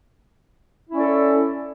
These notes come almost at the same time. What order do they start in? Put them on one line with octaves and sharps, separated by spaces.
E4 C#4 D5 A4